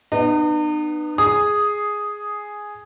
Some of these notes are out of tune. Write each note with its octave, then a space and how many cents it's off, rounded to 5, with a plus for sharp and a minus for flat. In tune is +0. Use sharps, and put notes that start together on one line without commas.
B3 +0 D#4 -45
G#4 +0 D#6 +0